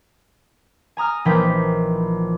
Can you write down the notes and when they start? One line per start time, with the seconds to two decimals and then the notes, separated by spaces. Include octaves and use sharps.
0.97 G#5 A#5 D#6 F6
1.25 A#1 E3 F3 D#4 G5 B6